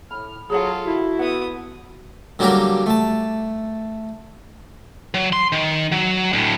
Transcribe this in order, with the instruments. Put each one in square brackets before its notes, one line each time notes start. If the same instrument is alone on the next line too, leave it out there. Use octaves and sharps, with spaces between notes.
[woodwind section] A2 F6 [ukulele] B5
[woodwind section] F#3 [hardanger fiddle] F4 A4 [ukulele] G#4 C#5 F#5
[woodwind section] E4 [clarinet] F#4
[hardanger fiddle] B3 D#6 [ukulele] E5 F#5
[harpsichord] D3 F#3 G3 A#3 G4 A#4
A3 A5
[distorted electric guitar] F#3
C6
D#3
F#3
D2 A2